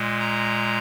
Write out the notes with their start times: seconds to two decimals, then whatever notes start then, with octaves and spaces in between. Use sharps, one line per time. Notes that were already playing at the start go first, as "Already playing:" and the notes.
Already playing: A#2 G#3
0.19 A#5